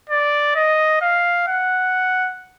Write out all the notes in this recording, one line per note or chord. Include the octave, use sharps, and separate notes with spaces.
D5
D#5
F5
F#5